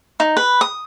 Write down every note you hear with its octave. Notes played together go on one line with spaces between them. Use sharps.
D#4
B4
D#6